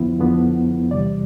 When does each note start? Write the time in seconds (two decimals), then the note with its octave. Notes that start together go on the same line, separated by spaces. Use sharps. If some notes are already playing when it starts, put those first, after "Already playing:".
Already playing: F2 D3 F3 B3 E4
0.20 F2 D3 F3 B3
0.91 E2 C3 E3 G3 D5